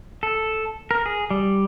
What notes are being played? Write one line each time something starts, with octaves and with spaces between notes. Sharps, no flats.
A4
A#4
G#4
G3